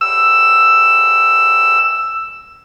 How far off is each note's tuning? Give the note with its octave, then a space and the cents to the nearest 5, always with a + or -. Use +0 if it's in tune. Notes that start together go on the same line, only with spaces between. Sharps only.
E6 +5